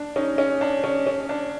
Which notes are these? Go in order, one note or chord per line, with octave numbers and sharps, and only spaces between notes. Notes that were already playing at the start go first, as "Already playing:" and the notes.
Already playing: D4
C#4 D#4
C#4
D4
C#4
C#4
D4